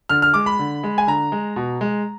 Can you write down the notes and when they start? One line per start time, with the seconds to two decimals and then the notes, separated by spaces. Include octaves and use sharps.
0.09 D3 F6
0.22 F6
0.34 G#3 D6
0.46 B5
0.59 D3
0.83 G#3
0.98 G#5
1.07 D3 A#5
1.32 G#3
1.56 B2
1.81 G#3